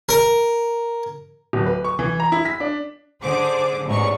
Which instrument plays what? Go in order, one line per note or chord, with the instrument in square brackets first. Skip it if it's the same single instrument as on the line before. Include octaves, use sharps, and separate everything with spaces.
[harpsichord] A#4
[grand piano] D1
B4
C#6
E3
A#5
E4
B6
D4
[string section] D3 G#4 C5 D6
A1 E2 G#2 C#6